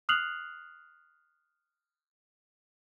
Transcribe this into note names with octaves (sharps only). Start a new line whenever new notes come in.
D#6 F6 F#6 C7 F7 F#7